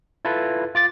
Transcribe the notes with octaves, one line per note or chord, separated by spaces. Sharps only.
E4 F4 A4 B4
F4 D6 A6